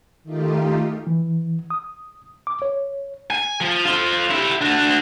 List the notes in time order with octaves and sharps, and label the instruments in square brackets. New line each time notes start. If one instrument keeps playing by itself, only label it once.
[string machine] D#3 A3 D#4 F4 G4
[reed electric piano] E3
D#6
D6
C#5
[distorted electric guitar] G#5
F3
C4 F4
E4 G4
D4 F#4